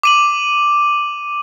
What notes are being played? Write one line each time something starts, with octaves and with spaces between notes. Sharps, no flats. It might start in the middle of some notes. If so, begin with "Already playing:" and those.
D6 D#7 F#7